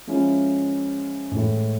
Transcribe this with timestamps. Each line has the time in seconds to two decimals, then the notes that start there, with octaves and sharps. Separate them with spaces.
0.07 F3 G#3 C#4 E4
1.31 A2 E3 G#3